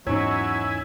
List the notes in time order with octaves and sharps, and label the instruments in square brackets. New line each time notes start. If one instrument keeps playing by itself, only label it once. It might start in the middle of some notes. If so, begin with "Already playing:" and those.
[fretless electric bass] E2 G#2 C#4 [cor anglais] F#3 [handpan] D#4 C#5 [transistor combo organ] E4 G#5